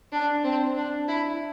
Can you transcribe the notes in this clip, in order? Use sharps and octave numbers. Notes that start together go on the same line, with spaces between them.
D4
C4
D4
E4